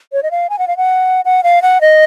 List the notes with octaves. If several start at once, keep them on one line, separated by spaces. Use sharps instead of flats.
C#5
D#5
F5
G#5
F#5
F5
F#5
F#5
F5
F#5
D#5